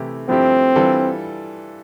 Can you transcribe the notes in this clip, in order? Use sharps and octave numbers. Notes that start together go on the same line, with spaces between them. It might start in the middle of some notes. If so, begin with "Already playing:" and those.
Already playing: C3 E3 A3 E4 G4
G2 F3 A3 C4 E4 G4
E3 G3 D4 F4 A4